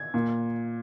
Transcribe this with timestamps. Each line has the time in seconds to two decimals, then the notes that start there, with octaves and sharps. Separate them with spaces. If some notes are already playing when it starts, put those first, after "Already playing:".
Already playing: G#6
0.14 A#2